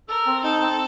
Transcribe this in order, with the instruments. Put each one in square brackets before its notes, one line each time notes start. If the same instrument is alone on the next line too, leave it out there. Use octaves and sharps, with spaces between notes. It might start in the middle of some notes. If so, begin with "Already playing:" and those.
[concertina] A4 [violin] A#4
[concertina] C4
[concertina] D#4 [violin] A4
[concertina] C4